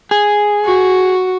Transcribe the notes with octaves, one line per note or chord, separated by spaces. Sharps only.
G#4
F#4